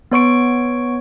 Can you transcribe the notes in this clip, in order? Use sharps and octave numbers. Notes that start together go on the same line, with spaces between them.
B3 C#5 C#6 D7